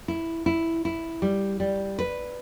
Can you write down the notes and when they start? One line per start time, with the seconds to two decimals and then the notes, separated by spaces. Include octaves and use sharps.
0.08 E4
0.46 E4
0.85 E4
1.22 G3
1.60 G3
1.99 B4